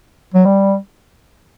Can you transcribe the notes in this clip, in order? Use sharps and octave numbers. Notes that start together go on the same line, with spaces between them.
F#3
G3